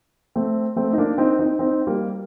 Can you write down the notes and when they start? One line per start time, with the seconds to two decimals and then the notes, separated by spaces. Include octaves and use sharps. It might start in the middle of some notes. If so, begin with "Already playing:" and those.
0.36 A3 C4
0.76 A3 C4
0.93 D#4
0.98 A#3 D4
1.18 C4 D#4
1.39 C4 D#4
1.59 C4 D#4
1.87 G3 A#3